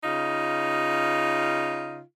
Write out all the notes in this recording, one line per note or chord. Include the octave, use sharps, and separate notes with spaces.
C#3 D#4 F4